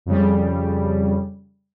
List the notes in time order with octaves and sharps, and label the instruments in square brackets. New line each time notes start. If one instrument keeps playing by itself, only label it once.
[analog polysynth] F2 C#3 G3